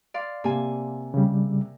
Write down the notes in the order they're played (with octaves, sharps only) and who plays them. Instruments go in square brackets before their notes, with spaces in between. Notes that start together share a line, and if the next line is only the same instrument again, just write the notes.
[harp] D5 F5 C6
[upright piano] C3 [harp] A#3 G#5
[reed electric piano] C#3 G3